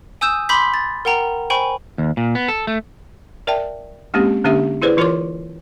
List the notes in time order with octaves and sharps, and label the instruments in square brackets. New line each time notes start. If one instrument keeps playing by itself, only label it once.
[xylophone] G#5 D#6 E6 G6 E7
B5 C6 D6 G6 B6
A6
A#4 F#5 G5 A#5
C5 G5 G#5 B5 C#6
[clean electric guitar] D#2
A#2
B3
A4
A3
[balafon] A#4 D5 E5 G5 A5
G#3 A#3 C4 C#4 G4
D3 A#3 C#4 D4 G4 E5
E4 G#4 B4 C5 D5
E3 F4 A#4 C#5 C6 D6